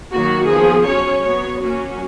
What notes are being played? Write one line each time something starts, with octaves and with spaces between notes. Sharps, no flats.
D#3 F#3 A#3 F#4
F3 B3 G#4
F#3 C#4 C#5
F#3 B3 C#5
F#3 A#3 C#4 F#4